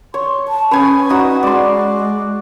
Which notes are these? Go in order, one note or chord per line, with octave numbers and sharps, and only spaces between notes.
C#5 C6
A5
C#4 B4 G#5 D#6
D#4 F#4 F#5
G#3 D5 C6